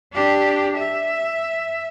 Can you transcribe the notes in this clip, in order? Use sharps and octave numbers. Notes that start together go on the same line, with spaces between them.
D4 G4
E5